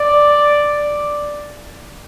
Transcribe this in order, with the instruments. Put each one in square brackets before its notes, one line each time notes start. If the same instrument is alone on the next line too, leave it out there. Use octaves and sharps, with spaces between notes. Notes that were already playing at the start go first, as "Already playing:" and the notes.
Already playing: [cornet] D5